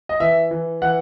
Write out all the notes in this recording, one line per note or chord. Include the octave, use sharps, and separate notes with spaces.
D#5
E3 E5
E3
E3 F#5